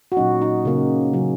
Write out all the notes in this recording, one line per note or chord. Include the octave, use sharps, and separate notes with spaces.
F#4
A#2 F#3 C#4 D#4
D#4
C#3 A#3 C#4
C#3 F#3 C#4